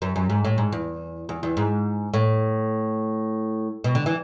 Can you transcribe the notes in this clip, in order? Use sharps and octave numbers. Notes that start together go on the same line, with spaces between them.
F#2
F#2
G#2
A2
G#2
E2
E2
E2
G#2
A2
B2
D3
E3